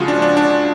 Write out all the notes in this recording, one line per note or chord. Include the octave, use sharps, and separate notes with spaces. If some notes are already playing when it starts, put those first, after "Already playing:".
Already playing: C#3 F3 G#3 F4 F#4
D4
D4
D4